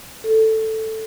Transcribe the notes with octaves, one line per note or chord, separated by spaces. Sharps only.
A4